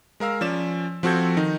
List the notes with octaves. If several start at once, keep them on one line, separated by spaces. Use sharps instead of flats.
G#3 A#4 F5 E6
F3 C#4 D5 E7
F3 C4 F#4 A4 G6 G#6
D#3 D#4